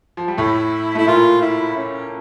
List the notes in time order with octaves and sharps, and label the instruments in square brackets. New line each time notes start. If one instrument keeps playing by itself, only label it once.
[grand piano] F3
G3
[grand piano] A2 A3 [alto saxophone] E4
[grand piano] A3 [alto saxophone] E4
[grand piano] A#2 A#3 [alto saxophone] F4
[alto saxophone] E4
C#4